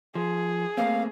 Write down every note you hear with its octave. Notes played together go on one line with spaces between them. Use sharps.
F3 G#4
A3 A#3 C4 F5